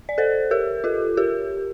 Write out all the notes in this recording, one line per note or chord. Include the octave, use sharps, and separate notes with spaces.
D5
A4 C5
G4 A#4
F4 A4
G4 A#4